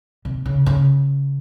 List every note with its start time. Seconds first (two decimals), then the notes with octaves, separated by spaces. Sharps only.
0.25 C3
0.46 C#3
0.66 C#3